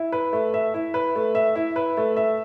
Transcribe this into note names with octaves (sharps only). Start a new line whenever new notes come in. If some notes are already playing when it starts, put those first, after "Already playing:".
Already playing: E4
B4
A3
E5
E4
B4
A3
E5
E4
B4
A3
E5